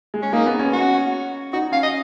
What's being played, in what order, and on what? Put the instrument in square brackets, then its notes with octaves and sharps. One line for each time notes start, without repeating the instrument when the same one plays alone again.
[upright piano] G#3
[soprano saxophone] C#4
[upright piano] A#3 [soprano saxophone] D#4
[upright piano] B3
C#4
[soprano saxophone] F#4
[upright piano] D#4 [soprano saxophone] F#4
[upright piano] C#4 [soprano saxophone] F5
[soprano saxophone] D#5